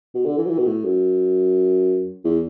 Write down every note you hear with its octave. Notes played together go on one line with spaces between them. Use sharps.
B2
D3
E3
F#3
E3
B2
A2
F#2
E2